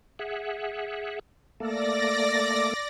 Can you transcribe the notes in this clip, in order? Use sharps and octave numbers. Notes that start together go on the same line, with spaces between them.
G#4 E5 F#5
A3 A#3 A4 D5 A#6